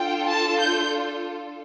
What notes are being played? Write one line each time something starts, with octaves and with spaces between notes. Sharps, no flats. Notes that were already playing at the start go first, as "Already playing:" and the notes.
Already playing: D4 F4 A4 G5
A5
G6